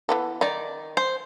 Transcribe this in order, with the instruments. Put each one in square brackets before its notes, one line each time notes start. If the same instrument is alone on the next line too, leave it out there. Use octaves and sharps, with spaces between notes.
[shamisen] E3 B3 A4
[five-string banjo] D#3 D5 [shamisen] D#4
[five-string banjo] C5